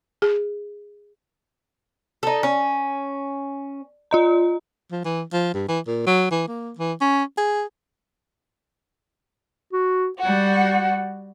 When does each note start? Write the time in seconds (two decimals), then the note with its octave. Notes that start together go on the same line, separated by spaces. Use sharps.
0.22 G#4
2.23 D#4 A4
2.43 C#4
4.11 F4 D#5 A#5
4.92 F3
5.05 E3
5.33 F3
5.54 G2
5.69 E3
5.87 A#2
6.07 F#3
6.31 E3
6.48 A#3
6.78 E3
7.01 C#4
7.38 G#4
9.73 F#4
10.19 G3 F#4 F#5